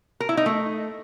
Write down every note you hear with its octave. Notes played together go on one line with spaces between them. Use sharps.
A#4
E4
D#4
A3